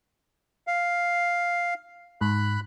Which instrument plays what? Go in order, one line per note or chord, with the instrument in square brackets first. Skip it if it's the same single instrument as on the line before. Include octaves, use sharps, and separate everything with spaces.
[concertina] F5
[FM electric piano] G#2 [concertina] B5 F#6